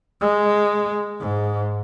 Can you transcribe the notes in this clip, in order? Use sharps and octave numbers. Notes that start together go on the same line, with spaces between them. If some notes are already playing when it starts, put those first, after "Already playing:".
G#3
G#2